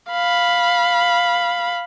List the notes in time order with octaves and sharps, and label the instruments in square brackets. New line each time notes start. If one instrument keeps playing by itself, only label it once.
[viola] F5 B5